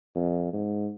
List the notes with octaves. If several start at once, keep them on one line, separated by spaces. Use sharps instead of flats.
F2
G#2